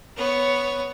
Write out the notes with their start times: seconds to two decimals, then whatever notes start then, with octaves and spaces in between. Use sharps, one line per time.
0.17 B3 C#5